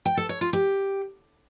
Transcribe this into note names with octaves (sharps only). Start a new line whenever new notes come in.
G5
A4
C#5
F4
G4